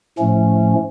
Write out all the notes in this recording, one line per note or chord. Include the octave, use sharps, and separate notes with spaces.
A2 F3 A3 C#4